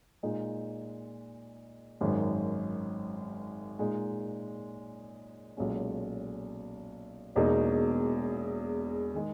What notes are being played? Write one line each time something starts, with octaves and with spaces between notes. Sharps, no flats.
A#2 G#3 D#4
G#1 F#2 D#3
A#2 G#3 D#4
B1 A#2 G#3 C#4
E1 E2 B2 A#3 D#4
D#3 G#3